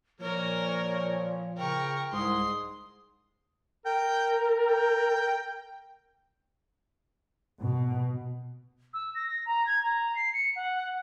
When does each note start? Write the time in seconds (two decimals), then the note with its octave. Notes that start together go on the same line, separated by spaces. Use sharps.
0.21 A#2 F3 A#3 A#4 C#5
1.58 C#3 A#4 G5 C#6
2.13 C2 G#2 C6 D#6
3.85 A#4 G5
4.67 G5
7.61 B2
8.94 E6
9.15 A#6
9.46 A#5
9.66 G#6
9.83 A#5
10.15 C7
10.33 C#7
10.56 F#5